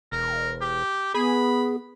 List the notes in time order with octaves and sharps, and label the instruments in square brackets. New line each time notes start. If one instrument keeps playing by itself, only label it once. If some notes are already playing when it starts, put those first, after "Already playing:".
[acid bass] E1 [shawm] A#4
[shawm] G4
[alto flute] B3 [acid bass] G#4 [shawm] B5